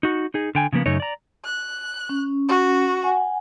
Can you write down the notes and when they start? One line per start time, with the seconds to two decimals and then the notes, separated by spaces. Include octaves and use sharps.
0.03 D#4 F#4
0.34 D#4 G#4
0.55 D3 G5 G#5
0.73 C#3 F3 A#3 B3
0.86 F#2 C#3 A3 D#4 C#5
1.00 D5 A#5
1.45 F#6
2.09 C#4
2.48 F#4
3.03 F#5 G#5